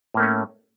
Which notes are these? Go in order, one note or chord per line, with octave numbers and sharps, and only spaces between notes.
A2 A3 A#3 C#4